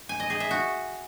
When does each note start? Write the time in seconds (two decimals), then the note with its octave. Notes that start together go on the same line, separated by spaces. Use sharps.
0.09 G#5
0.20 D#5
0.30 G#4
0.40 E5
0.51 F#4